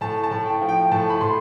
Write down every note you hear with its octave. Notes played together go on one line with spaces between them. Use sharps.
A2 A5
A5
A2
G5
F3
G5
A2 A5
B5
A2 C6